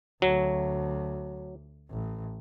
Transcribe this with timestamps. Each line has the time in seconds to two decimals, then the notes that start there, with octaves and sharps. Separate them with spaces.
0.22 D2 F#3
1.90 A1